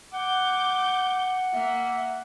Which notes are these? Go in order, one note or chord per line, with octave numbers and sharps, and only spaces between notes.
F#5 D6 G6
A#3 E5